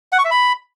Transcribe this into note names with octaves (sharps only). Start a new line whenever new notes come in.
F#5
C#6
E5
B5